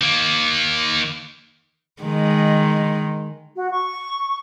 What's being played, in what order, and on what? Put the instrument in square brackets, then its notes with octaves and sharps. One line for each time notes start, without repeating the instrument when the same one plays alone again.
[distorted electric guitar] D#3 A#3
[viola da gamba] D#3 G#3
[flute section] F#4
C#6